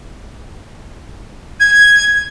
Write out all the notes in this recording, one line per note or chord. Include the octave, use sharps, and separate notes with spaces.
G#6